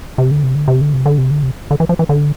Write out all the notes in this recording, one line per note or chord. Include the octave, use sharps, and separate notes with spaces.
C3
D3
C3
D3
C3
D3
C3
D3
C3
D3
C3
D3
E3
F3
E3
D3